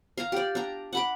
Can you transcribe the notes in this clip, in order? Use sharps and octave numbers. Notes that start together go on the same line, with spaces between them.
F5 A#5
G4 D5
D4 A#5
F#5 B5 D6